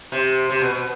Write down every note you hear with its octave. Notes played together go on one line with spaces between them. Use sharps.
C3
C3
B2
B2